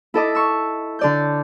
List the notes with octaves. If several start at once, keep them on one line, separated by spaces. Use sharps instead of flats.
E4 A4 D#5 D6
C#6 E6
D3 D5 G6